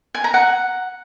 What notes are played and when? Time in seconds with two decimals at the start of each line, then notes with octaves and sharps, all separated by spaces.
0.15 G#5
0.24 A#5
0.34 F#5